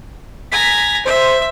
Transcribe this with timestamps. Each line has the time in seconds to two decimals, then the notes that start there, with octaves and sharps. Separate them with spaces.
0.51 G#5 A#5 B6
1.05 C5 E5